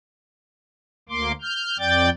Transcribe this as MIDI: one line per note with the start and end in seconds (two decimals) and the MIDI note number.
1.09 1.32 38
1.09 1.32 58
1.09 1.32 84
1.09 1.32 86
1.41 1.78 89
1.41 1.78 91
1.79 2.10 41
1.79 2.10 74
1.79 2.10 79
1.79 2.10 91
1.79 2.10 93